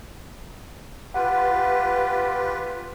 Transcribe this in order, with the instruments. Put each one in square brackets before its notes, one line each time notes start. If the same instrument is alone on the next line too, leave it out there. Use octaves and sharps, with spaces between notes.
[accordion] F4 G4 B4 [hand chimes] F#5